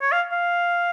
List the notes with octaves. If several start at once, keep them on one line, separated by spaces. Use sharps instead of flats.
C#5
F5
F5